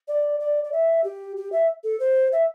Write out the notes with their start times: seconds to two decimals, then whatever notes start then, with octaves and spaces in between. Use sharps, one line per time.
0.08 D5
0.40 D5
0.64 D5
0.72 E5
1.04 G4
1.37 G4
1.52 E5
1.84 A4
2.00 C5
2.32 E5